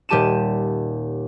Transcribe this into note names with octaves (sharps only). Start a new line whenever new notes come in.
D#1 G3 G4 A5 D#7 E7